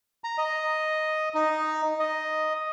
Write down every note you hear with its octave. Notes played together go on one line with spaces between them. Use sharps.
A#5
D#5
D#4
D#5